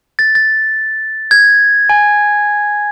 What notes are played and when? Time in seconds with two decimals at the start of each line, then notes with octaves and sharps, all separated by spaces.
0.19 A6
0.35 A6
1.31 G#6
1.89 G#5